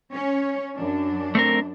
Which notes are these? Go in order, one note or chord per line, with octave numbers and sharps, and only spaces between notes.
C#4 C#5
F#2 D4
A3 C4 A#4